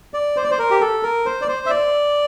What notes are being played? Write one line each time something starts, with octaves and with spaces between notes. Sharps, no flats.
D5
C5
D5
C5
A#4
G4
A4
A#4
C5
D5
C5
E5
D5